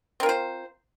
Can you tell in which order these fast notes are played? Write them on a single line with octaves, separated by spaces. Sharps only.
C4 A#4 F4 C5